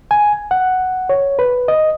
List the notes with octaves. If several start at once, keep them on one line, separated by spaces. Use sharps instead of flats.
G#5
F#5
C#5
B4
D#5